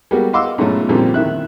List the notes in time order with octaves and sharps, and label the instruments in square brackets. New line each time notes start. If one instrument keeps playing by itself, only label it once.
[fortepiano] G3 G#3 A#3 B3 F#4
D#5 F5 F#5 C6 D6 E6
G#2 B2 F#3 A3 C#4 F4
F2 A#2 D3 G3 A3 C4
A2 D#3 E5 F#6